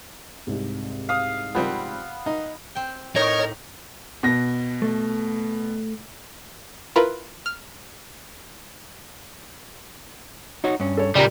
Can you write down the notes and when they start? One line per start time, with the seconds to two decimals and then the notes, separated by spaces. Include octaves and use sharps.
0.47 C2 G#2 C3
1.09 F5 D#6
1.55 F3 G3 B3 C4
2.26 D#4 A#5
2.75 C4 G5
3.16 A2 D#4 A#4 C#5 D#5
4.23 B2 A#6
4.82 A3
6.96 E4 F4 A#4 B4
7.46 F6
10.64 D#4 F#4 C#5
10.80 G2 C#4
10.97 A4 C#5
11.15 A#2 C#3 G3 G4 D5 A#5